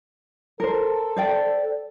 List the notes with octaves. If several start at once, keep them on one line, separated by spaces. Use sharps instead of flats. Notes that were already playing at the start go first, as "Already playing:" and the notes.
A4 A#4 C5
C5 D5 G5